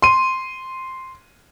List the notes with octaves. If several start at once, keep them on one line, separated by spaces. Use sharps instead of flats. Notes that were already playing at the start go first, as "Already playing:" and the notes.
C6 D#7